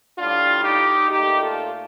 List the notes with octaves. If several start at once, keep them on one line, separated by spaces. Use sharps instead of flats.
A2 G3 D4 F4
D#4 G4
A#2 A3 D#4 G4
F4 A4